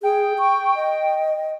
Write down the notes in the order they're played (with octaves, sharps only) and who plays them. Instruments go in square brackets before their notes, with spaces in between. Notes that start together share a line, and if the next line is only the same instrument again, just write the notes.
[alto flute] G#4 [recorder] G5
[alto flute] C#6
D#5